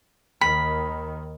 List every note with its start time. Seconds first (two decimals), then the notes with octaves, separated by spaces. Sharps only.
0.41 D#2 D#3 B5